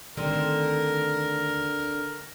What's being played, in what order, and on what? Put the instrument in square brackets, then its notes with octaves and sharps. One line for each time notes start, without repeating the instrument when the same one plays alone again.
[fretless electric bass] D2 D#3 [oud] D3 C4 [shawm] A#4